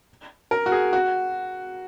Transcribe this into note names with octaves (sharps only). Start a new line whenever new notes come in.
A#4
F#4
G#4
F#4